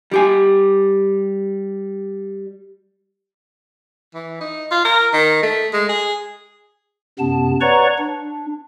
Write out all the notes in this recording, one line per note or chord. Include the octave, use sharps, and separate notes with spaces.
G3 G4 G#5
E3
D#4
F4
A#4
D#3
A3
G#3
G#4
F#2 C3 B3 A5
B4 C#5 D5 F#5 A#5 C#6
D4